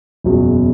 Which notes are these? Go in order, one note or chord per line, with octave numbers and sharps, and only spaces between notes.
F#1 E2 B2 F#3